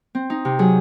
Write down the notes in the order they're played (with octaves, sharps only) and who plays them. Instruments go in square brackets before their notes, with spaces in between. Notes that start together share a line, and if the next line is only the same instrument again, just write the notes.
[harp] C4
D#4
C3
F#3 G#4